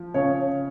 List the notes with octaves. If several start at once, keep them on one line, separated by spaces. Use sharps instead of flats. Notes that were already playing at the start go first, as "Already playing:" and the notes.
Already playing: F3
C#3 C#5